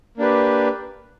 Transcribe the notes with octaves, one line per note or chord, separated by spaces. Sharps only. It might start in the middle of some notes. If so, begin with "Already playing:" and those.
A#3 D4 G4 B4